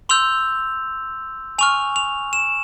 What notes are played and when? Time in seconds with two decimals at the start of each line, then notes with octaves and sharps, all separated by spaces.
0.09 C6 E6 G6 F7
1.58 G#5 C#6 F6 F7
1.96 F7
2.33 E7